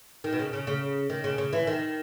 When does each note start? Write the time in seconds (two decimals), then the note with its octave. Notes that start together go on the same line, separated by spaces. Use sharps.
0.24 D#3
0.32 B2
0.39 C#3
0.53 C#3
0.67 C#3
1.10 D#3
1.24 C#3
1.38 C#3
1.53 E3
1.67 D#3